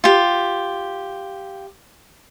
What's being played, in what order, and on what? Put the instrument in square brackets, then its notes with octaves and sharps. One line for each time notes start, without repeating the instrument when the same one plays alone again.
[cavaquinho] F4 G4